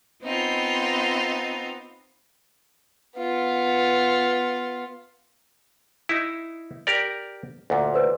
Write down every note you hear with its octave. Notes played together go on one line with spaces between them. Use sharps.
B3 C4 D#4 F4
B3 F4
D#4 E4
G4 A#4 D5
D2 A#2
B4 C5